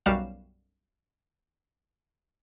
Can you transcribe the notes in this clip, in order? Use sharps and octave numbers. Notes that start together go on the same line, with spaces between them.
B1 F#2 G3 F#4 F5 E7